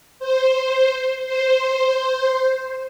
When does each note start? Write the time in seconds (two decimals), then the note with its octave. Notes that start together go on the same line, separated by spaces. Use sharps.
0.19 C5
1.26 C5